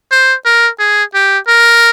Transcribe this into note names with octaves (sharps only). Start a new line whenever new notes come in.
C5
A#4
G#4
G4
A#4